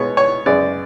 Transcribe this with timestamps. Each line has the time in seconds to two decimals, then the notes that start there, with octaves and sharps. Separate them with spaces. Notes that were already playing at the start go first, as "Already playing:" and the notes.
Already playing: B2 G#3 B3 C#5
0.17 C#5
0.46 F#2 C#3 G#3 B3 D5